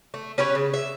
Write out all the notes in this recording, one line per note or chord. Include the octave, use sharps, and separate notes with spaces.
A3
C#4 G4 B4 C#5
C#3
E5